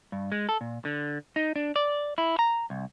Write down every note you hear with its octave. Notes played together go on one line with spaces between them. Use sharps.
G2
G#3
A4
A#2
D3
D#4
D4
D5
E4
A#5
C2